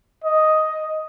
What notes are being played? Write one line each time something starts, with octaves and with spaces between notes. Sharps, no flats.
D#5